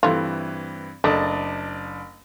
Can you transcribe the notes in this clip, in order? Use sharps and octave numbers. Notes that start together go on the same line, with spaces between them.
G2 E3 A3 C4 F4
F#1 A3 D4 D#5